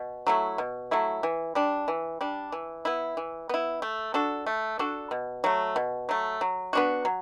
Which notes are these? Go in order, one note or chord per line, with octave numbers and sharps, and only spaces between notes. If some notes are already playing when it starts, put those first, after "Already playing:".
Already playing: B2
F#3 A3 E4
B2
F#3 A3 E4
E3
G3 D4
E3
G3 D4
E3
B3 E4
E3
B3 E4
A3
D4 F#4 A4
A3
D4 F#4 A4
B2
F#3 A3
B2
F#3 A3
F#3
B3 D4 F#4
F#3